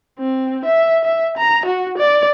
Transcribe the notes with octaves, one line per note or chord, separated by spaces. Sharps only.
C4
E5
E5
A#5
F#4
D5